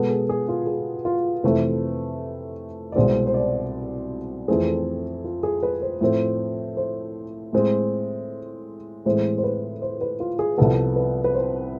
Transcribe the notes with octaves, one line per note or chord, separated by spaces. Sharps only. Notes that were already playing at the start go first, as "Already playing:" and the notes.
Already playing: B2 G#3 B3 A4
G#4
G#4
F4
G#4
F4
F2 C3 E3 A3 C4 B4
D5
C2 B2 G#3 C4 C5
C5
D5
F2 E3 A3 C4 G#4
F4
G#4
B4
C5
A2 F3 A3 C4
C5
A2 G#3 C4
A2 E3 G#3 C4 C5
C5
B4
C5
B4
F4
G#4
C2 C3 F3 B3 A4
B4
B4
C5